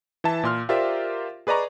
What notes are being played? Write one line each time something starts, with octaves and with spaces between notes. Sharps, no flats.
E3 E5 A5
A#2 C6 F6
F4 G4 A#4 C5 D5 E5
G#4 B4 D5 D#5 A#5 C#6